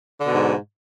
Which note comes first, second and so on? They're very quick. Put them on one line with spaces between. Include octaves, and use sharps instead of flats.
D3 B2 G#2